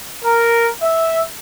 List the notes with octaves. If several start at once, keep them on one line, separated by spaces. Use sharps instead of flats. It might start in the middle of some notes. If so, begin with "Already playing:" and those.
A#4
E5